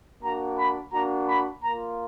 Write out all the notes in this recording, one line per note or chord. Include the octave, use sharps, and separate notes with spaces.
A#3 D4 F#4 A#5
B5
A#3 D4 F#4 A#5
B5
A#3 A#5
F4